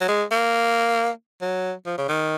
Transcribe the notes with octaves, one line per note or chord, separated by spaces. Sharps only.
F#3
G#3
A#3
F#3
F3
C#3
D#3